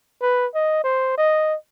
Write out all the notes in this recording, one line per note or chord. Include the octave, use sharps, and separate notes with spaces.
B4
D#5
C5
D#5